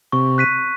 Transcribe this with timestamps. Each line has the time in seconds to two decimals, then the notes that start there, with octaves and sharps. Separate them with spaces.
0.12 C3 C#6
0.38 F#6 B6 D#7